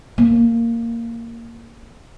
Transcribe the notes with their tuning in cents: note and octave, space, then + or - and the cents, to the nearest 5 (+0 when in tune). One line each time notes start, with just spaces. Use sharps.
A#3 -10